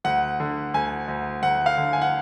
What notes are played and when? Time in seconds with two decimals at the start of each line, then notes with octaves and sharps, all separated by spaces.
0.04 D2 F#5
0.40 D3
0.74 D2 G#5
1.08 D2
1.43 D2 F#5
1.66 F5
1.77 D3
1.93 G#5
2.02 F#5